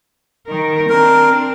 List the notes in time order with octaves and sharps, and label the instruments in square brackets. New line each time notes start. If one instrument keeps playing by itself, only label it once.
[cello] D#3 A#4
[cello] C4 D4 [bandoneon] A#4